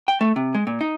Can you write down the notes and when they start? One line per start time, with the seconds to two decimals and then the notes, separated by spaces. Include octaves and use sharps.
0.08 G5
0.21 A3
0.36 C3
0.54 G#3
0.67 A#2
0.81 D#4